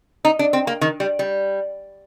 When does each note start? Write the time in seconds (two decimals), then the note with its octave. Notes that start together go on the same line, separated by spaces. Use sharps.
0.25 D#4
0.39 D4
0.53 C4
0.67 A#3
0.81 D#3
1.00 G3
1.19 G3